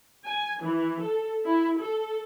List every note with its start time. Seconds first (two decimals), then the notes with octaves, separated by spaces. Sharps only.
0.24 G#5
0.61 E3
1.00 A4
1.44 E4
1.78 A4